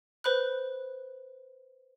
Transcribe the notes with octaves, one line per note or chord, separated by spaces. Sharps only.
B4 C5 B5 F#6